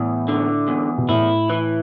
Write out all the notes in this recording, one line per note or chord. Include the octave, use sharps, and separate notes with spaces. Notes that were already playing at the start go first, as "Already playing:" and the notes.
Already playing: E2 A2
D3
E2
B2
A2 E4
E3